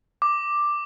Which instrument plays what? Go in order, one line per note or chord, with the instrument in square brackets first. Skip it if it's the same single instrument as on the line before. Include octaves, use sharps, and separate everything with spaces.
[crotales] D6